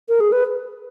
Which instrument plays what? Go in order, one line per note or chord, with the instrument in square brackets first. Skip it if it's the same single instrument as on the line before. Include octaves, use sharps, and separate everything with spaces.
[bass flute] A#4
G#4
B4